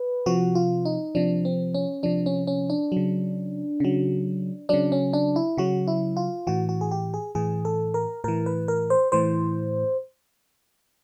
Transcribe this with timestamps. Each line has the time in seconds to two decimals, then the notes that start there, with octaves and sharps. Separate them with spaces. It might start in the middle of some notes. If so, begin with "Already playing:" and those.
Already playing: B4
0.26 C3 F3 F#4
0.55 F4
0.85 D#4
1.15 C3 F3 D4
1.45 C4
1.75 C#4
2.03 C3 F3 D4
2.26 C#4
2.47 C#4
2.70 D4
2.92 C#3 F#3
3.80 C#3 F#3
4.69 C#3 F#3 D4
4.92 C#4
5.13 D4
5.36 E4
5.57 C#3 F#3 F#4
5.88 E4
6.17 F4
6.47 A2 E3 F#4
6.69 F#4
6.81 G#4
6.91 G4
7.14 G#4
7.35 A2 E3 G#4
7.65 A4
7.94 A#4
8.24 A2 E3 A#4
8.46 B4
8.68 A#4
8.90 C5
9.12 A2 E3 C5